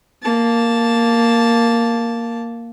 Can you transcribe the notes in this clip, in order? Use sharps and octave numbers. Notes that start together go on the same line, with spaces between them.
A#3 A5